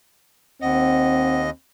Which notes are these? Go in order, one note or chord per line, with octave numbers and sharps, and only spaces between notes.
D#2 C4 D#5 F#5